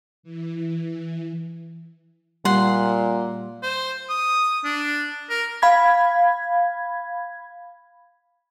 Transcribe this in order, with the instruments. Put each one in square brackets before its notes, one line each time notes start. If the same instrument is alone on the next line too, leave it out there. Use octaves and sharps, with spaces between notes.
[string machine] E3
[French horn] A#2 [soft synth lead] G3 [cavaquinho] F#5 C6
[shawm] C5
D#6
D4
A#4
[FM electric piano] F5 B5 G#6